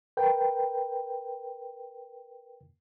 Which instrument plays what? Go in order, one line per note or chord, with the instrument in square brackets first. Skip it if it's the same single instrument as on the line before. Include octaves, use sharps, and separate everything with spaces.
[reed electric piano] A#4 B4 G5